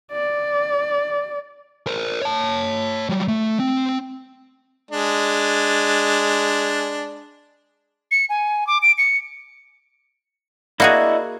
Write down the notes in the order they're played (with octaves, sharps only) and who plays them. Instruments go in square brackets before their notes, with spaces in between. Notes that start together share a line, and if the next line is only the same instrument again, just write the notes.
[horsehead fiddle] D5
[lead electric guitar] A#4 C5
C#5 A5
F#3 G3
A3
C4
[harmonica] G#3 D4
[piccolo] C#7
G#5
D6
D7
C#7
[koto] A#3 F#4 G#4 [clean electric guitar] E4 D5 D#5